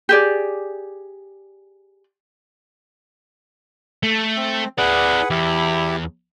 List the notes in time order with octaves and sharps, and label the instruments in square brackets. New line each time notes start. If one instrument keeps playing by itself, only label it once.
[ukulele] G4 G#4 D5
[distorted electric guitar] A3
[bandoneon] C4
[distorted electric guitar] E4 D5 [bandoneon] G#4 B4 F#5
[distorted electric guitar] E2 [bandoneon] E4 G4